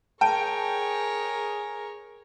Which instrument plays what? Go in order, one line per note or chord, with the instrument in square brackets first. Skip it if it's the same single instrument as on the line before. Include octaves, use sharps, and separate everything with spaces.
[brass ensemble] G#4 [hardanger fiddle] A#4 C#5 [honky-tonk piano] G5 [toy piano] A5